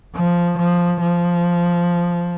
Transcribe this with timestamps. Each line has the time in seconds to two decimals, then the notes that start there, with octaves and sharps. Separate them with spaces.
0.16 F3
0.58 F3
1.02 F3